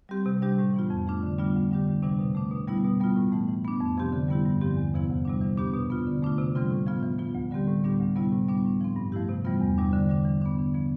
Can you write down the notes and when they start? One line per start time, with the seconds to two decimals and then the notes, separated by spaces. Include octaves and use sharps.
0.09 G3 C4 G4
0.26 C3
0.42 G3 D4 G4
0.58 A2
0.74 E3 B3 F4
0.90 F2
1.07 E3 A3 D4 F4
1.23 D3
1.38 G3 B3 D4 F4
1.55 D2
1.71 D3 G3 D4 G4
1.87 D2
2.03 C3 E3 G3 D4
2.19 B2
2.35 A3 D4
2.51 B2
2.68 G3 B3 E4
2.84 B2
3.00 G3 B3 F4
3.16 A2
3.32 E3 A3
3.48 E3
3.64 B3 D4
3.80 F2
3.97 C3 F3 C4 G4
4.12 D3
4.28 G3 B3 E4 G4
4.45 G2
4.61 D3 F3 C4 G4
4.77 E2
4.94 C3 F3 B3 E4
5.10 D2
5.25 C3 G3 D4
5.41 E3
5.57 B3 D4 G4
5.73 B2
5.90 B3 F4
6.07 D3
6.22 A3 D4 F4
6.39 C3
6.55 E3 G3 C4 F4
6.71 A2
6.87 F3 B3 F4
7.03 E3
7.19 B3 F4
7.35 D2
7.51 D3 G3 C4 G4
7.67 A2
7.84 G3 B3 D4 G4
8.00 D2
8.15 C3 G3 B3 E4
8.31 A2
8.48 G3 B3 D4
8.65 A2
8.81 F3 C4
8.96 G2
9.12 F3 A3 E4 G4
9.29 C3
9.45 E3 G3 B3 F4
9.61 E2
9.78 C3 G3 D4
9.93 D3
10.09 G3 D4
10.25 E3
10.41 B3 D4
10.58 D3
10.74 F3 B3